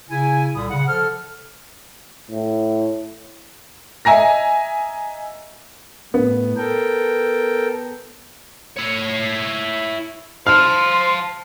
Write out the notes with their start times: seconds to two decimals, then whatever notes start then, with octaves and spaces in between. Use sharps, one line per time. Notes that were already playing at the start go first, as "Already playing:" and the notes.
0.09 C#3 E4 G#5
0.55 C2 A#2 D3 G3 B5 D#6
0.70 C#3 F#5
0.87 F3 A4 F6
2.31 A2
4.05 D#5 E5 G#5 A#5 A#6
6.14 A2 B3
6.57 A4 A#4 G5
8.77 E4 C#5
10.47 C5 F5 A5 F6